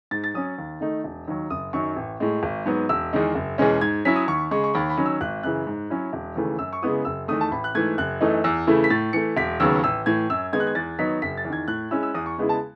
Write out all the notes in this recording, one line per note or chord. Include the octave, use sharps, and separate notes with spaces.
G#2 A6
A6
F#3 C#4 D#6
D#2
D#3 A3 D#4
E1
D#2 D#3 F#3
F#1 D#6
F#2 D#3 F#3 C#6
A1
A2 G#3
G#1
G#2 F#3 B3
E1 E6
E2 D#3 G#3 D#4
F#1
E2 B2 G#3 C#4
G#2 G#6
F#3 C#4 E4 B6
D#6
D#2 C#6
C#3 G#3 C#6
C#6
D#2 B5
B5
D#3 F#3 C#4
E6
G#1 F#6
F#2 C#3 E3 F#6
G#2
F#3 C#4 E4
E1
D#2 C#3 E3 A3
F#2 E6
C#6
C#3 G#3 B3 E4 D#6
F#1 E6
E2 D#3 A3 D#6
A5
A1 B5
F#6
G#2 E3 A3 G#6
F#1 F#6
F#2 E3 A3 D#4
E2 E6
C#3 E3 A3 E4
B6
A2 A6
E3 A3 C#7
E1 B6
D#2 C#3 F#3 B3 E6
A1 E6
A2 E3 G#6
F#2 E6
D#3 G#3 B3 D#4 G#6
F#6
G#6
E2 A6
D#3 F#3 B3 D#4 B6
F#1 B6
A6
E2
D#3 G#6
A2 F#6
G#3 C#4 E4 E6
E6
E2 D#6
C#6
C#3 G#3 B3 E4
A5